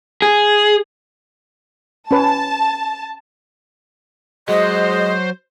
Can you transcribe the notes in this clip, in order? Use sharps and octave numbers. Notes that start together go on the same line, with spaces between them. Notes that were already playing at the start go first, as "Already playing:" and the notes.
G#4
C#4 B4 A5
F#3 G#3 C5 D#5